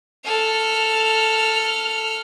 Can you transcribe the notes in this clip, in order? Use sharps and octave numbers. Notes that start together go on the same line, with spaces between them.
A4 F6